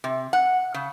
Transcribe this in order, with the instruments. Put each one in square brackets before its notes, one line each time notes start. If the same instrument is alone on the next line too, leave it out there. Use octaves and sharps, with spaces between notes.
[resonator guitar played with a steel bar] C3
F#5
C#3